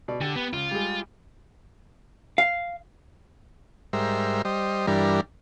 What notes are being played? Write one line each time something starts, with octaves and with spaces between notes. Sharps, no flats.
B2 D5
D3 G4 G5
B3
C#2 F4
G3 G#3
F5
G#2 G3 A#4 C5 E5
G3 C5 D#5
G2 E3 G3 D4 A#4